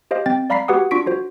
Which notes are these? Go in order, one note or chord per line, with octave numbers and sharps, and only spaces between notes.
G4 C5 D#5 F5
C4 G5 A6
D5 F5 A#5 B5 B6 C7
F#4 G4 B4 F#5 D#6
D4 F4 C#6 B6 D7
F4 F#4 C5